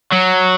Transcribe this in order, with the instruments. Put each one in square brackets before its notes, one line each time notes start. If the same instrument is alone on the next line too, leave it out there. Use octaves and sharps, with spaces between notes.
[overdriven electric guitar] F#3